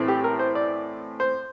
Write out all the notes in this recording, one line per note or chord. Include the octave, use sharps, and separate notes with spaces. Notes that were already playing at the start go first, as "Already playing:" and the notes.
Already playing: A2 E3 A3 C4
G4
A#4
C5
D5
C5